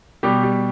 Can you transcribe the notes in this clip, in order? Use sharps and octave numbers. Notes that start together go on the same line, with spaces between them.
B2 G3 G4
G3